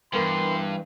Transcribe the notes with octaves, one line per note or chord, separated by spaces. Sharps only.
G2 E3 B3 A#4 C6 D#7